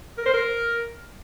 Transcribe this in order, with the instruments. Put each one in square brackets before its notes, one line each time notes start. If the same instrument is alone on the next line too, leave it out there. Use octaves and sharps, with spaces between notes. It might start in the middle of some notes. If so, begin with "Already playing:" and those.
[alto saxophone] A#4
C5
A#4